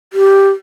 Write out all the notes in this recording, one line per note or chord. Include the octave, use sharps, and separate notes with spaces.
G4